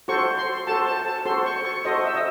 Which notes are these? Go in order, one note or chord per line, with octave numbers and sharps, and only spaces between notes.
F#4 A4 C5 C#6
C6
F#4 A4 C5 A5
A5
A5
F#4 A4 C5 C6
C#6
C#6
F#4 A4 C5 D#5
E5
D#5